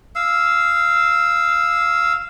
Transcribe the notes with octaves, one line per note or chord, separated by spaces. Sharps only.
F5 E6